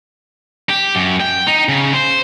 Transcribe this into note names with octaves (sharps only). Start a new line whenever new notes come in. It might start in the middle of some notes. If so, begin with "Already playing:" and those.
G4
F#2
G5
D#4
C#3
C5